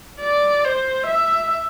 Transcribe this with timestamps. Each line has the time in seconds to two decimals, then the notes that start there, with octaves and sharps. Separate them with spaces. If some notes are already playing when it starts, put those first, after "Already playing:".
0.22 D5
0.65 C5
1.07 E5